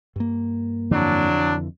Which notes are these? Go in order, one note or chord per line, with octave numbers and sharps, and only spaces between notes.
G2 A#3
F2 D3 E3 F#3 D4